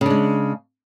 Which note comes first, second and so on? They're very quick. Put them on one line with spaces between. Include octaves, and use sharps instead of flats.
C#3 D4 G#3